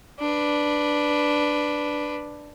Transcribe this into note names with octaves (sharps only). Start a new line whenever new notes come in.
D4 B4